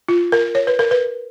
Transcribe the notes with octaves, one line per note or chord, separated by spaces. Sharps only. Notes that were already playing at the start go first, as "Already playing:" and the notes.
F4
A#4
C#5
B4
A#4
B4